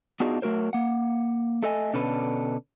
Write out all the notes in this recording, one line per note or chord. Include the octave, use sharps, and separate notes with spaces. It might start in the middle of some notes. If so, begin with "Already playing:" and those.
B3 D4 D#4 F4 F#4 G#4
F#3 A3 F#4 A#4 C5
A#3 F#5
A3 A4 D#5 G#5
B2 D3 C#4 D4 A4 B4